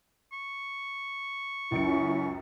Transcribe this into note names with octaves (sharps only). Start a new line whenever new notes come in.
C#6
C#2 F#2 C#4 E4 C#7